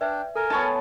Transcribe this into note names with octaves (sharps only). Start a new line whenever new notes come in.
D4 B4 D5 E5 G5
A4 A#4 G#5
B3 D#4 F4 C#5 A5 A#5